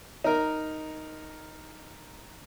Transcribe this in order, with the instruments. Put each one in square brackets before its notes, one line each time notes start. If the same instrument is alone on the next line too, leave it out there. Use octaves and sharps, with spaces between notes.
[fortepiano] D#4 A#4